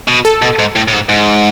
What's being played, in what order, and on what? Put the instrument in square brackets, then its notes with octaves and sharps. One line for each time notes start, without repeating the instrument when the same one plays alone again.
[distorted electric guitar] B2
[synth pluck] A4
[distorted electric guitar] B2
G#2
A2
A2
G#2
G#2